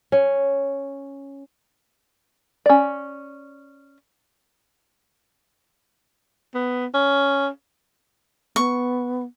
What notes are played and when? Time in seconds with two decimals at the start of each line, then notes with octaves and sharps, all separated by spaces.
0.12 C#4
2.66 C#4 D5
6.54 B3
6.94 C#4
8.56 B3 C#6